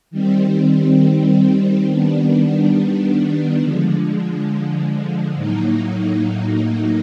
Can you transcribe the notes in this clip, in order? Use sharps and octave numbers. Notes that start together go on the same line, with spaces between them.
D#3 G3 C4
D#3 G3 B3 D4
D3 F3 G#3
A2 F#3 A#3 D#4